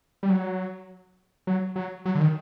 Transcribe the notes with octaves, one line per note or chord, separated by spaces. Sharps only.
G3
F#3
F#3
F#3
F#3
D3
D#3